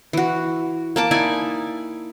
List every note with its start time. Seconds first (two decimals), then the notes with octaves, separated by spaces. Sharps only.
0.13 E3 F#4
0.96 A#3 A5 D6
1.11 D#4 E4 D5 G#5